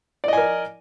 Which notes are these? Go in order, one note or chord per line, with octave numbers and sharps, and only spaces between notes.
A#4 D5 D#5 G#5